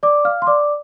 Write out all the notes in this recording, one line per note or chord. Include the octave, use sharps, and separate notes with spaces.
D5 D6
F5 F6
C6
D5 D6